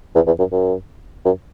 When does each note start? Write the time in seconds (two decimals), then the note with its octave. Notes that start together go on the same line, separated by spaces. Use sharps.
0.15 E2
0.27 E2
0.39 F#2
0.52 F#2
1.25 F#2